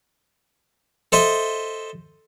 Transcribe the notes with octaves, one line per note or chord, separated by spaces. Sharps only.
A4 C5 D#5 E5